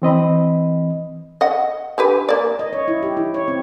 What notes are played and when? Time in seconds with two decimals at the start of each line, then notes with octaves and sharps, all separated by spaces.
0.02 E3 C4 D#5 B5
1.41 D#5 F#5
1.98 D3 G4 B4
2.29 A#3 D5
2.59 D#5
2.73 C#5
2.88 E4
3.03 G4
3.17 E4
3.34 C#5
3.48 C4